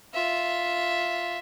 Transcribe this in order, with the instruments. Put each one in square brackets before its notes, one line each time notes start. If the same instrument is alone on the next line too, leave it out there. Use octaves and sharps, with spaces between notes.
[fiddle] F4 E5